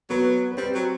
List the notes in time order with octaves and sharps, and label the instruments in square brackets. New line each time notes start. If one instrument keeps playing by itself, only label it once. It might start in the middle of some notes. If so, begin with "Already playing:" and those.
[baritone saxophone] F#3 [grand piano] B3 B4
[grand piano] B4
[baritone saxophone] G3 [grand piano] C4 C5
[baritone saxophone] F#3